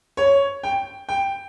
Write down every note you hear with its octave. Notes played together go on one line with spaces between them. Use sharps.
C#5
G5
G5